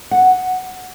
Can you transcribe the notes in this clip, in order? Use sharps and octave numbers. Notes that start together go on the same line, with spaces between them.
F#5